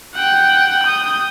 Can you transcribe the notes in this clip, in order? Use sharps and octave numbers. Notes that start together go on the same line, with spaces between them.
F#5 G5
D#6 G6